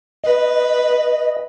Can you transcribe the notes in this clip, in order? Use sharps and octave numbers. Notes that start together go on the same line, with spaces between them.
B4 D#5